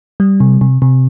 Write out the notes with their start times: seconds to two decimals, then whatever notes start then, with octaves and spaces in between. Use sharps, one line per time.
0.20 G3
0.40 C3
0.61 C3
0.82 C3